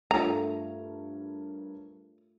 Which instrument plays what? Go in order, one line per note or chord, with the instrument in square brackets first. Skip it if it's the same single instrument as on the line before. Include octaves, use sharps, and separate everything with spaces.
[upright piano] G2 A#4 C#5 [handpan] A3 F4 [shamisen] A#5